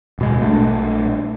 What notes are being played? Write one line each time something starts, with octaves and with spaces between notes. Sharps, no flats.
D1 B2 G#3
A#1 A3 C#4 D4